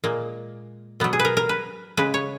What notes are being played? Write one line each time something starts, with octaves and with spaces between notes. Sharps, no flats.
A#2 G#3 A#3
B2 F#3 B3
G#4
B4
A#4
A#4
B4
C#3 G#3 B4
C#5